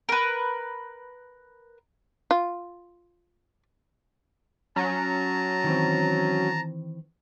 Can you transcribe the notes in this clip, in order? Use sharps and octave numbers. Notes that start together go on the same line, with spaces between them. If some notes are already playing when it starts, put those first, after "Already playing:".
A#4 B4
F4
F#3 C#4 A5 A#5
D#3 E3 C4